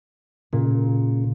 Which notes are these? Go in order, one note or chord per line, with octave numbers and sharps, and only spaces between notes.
A#2 C#3